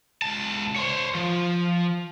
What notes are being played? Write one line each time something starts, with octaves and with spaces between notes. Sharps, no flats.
C#2 A5
C5 C#5
F3